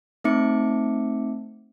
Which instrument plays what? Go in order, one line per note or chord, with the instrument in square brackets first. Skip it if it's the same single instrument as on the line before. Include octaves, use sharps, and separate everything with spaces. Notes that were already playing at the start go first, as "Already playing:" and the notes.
[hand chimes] A3 C4 D#4 E5 D6 C#7